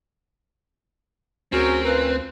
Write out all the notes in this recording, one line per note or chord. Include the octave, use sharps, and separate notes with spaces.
D2 C4 C#4 F#4 G#4 A#4
C#4 F4 A#4 B4